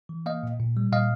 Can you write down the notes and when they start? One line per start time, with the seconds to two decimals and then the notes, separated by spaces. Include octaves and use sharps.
0.09 E3
0.26 A#3 D#5 F5
0.43 A#2
0.60 A#2
0.77 G3
0.92 A#2 D#5 F5